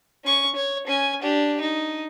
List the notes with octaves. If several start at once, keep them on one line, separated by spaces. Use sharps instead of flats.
C#4 C#6
C#5
C#4 G#5
D4 G4
D#4